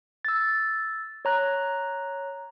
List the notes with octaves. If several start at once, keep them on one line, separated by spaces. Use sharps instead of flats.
E6 A6
C#5 A#5 F#6